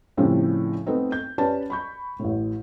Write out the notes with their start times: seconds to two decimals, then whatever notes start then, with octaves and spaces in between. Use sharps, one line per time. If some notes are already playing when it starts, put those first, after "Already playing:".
0.17 A2 C#3 F3 G3 A3 C4
0.86 A3 B3 C4 D#4
1.12 G6
1.38 C#4 G4 B4 D5 A5
1.70 B5 C#6 G6
2.19 A1 A2